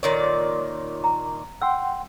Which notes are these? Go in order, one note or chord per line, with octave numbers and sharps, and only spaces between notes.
A#2 D#3 C#5 D5
A#5
F#5 G5 C6 E6